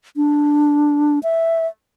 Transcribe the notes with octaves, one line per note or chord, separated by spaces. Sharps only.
D4
E5